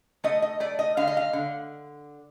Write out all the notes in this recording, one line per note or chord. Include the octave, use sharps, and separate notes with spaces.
A3 D#5
D#5
A3 D5
D#5
D3 F5
D#5
F5
D3